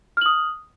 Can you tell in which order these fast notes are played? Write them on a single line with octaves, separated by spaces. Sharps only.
F6 F#7 D#6